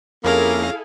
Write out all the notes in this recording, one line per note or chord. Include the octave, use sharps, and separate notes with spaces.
F2 A#3 C#4 E4 G#4 A4 F5 A#6